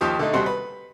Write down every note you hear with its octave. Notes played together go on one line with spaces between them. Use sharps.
D#2 F3 G4 D#6
D3 A3 D#4
D#2 C3 G3 F#4 C5 F#5
B4